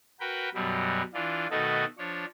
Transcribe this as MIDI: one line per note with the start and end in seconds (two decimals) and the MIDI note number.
0.20 0.49 66
0.20 0.49 70
0.20 0.49 71
0.20 0.49 79
0.54 1.02 42
0.54 1.02 47
0.54 1.02 54
0.54 1.02 55
1.14 1.47 52
1.14 1.47 62
1.14 1.47 65
1.51 1.85 47
1.51 1.85 51
1.51 1.85 57
1.51 1.85 63
1.51 1.85 66
1.51 1.85 69
1.98 2.25 53
1.98 2.25 62
1.98 2.25 73